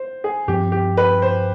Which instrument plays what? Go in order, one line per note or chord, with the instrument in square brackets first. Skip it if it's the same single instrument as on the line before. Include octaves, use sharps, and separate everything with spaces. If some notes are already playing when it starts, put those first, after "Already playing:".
Already playing: [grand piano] C5
G#4
[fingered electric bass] G2 F3 C4 [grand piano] G4
[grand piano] G4
B4
C5